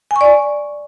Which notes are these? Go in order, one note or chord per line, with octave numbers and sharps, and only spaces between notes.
G#5
C#6
D5